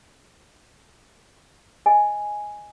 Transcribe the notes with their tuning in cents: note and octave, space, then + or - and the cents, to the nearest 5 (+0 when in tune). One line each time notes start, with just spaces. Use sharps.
D#5 +0 G#5 +0